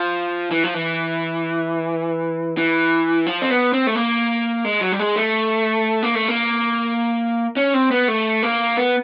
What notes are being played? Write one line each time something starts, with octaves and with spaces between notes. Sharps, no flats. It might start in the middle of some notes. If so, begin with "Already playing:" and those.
Already playing: F3
E3
F3
E3
E3
F3
C4
B3
C4
A3
A#3
G#3
F#3
G3
G#3
A3
A#3
A3
A#3
C#4
C4
B3
A3
A#3
B3